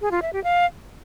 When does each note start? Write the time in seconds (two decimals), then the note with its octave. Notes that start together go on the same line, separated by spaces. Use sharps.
0.01 G#4
0.11 F4
0.22 E5
0.33 G4
0.44 F5